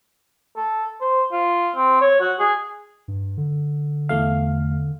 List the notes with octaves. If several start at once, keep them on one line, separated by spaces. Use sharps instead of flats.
A4
C5
F4
C4
C#5
F#4
G#4
G2
D3
E2 A3 F5